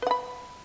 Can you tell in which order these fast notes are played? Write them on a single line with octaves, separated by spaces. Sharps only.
B4 F#5 B5